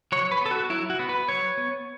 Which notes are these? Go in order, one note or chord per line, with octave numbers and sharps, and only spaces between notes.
F#3 C#5
B4
B3 A4
F#4
F#3 E4
F#4
B3
B4
F#3 C#5
B3